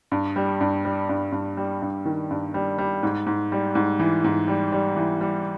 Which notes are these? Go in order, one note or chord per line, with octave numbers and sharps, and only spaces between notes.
G2
G3
G2
G3
G2
G2
G3
G2
D#3
G2
G3
G3
G#2
G#2
G3
G#2
E3
G#2
G3
G3
E3
G3